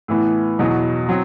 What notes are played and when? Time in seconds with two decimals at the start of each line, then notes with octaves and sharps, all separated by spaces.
0.08 A2 E3 B3
0.59 E2 B2 F#3
1.09 F#3 C4